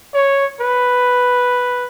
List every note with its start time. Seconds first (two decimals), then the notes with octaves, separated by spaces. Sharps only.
0.14 C#5
0.60 B4